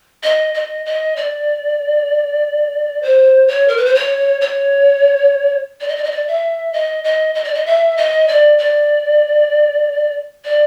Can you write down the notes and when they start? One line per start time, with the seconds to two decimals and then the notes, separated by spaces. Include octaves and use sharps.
0.23 D#5
0.54 D#5
0.86 D#5
1.16 D5
3.02 C5
3.48 C#5
3.68 A#4
3.77 B4
3.85 C5
3.95 C#5
4.41 C#5
5.81 D5
5.88 D#5
5.96 D5
6.04 D#5
6.11 D5
6.27 E5
6.73 D#5
7.04 D#5
7.35 D#5
7.44 D5
7.54 D#5
7.66 E5
7.97 D#5
8.28 D5
8.58 D5
10.45 D5